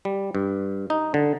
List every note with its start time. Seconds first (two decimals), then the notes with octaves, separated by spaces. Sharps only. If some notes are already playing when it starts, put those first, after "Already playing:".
0.05 G3
0.35 G2
0.90 D#4
1.14 D3